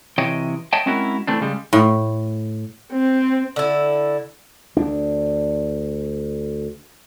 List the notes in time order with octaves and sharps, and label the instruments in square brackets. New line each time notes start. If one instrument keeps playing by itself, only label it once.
[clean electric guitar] C3 E3 C#5 D#5 G5
C#5 D#5 E5 G5 A5
G#3 C4 C#4 E4 F#4 A#4
E3 A3 C4 D4
C#3 G3 G#3
[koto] A2
[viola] C4
[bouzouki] D3 E4
[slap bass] D2 D4